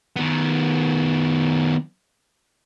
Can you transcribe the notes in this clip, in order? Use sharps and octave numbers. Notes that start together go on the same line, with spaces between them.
D#3 B3